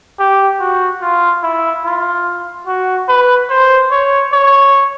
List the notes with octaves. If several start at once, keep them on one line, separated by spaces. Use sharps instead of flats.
G4
F#4
F4
E4
F4
F#4
B4
C5
C#5
C#5